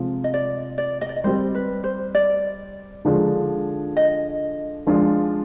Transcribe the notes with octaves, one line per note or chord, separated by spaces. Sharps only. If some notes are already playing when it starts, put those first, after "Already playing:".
Already playing: C3 F3 G#3
D#5
D5
D5
D#5
D5
D#5
G3 C4 G4 C5
B4
C5
D5
D3 F3 G#3 D4 G#4
D#5
F3 G#3 D4 F4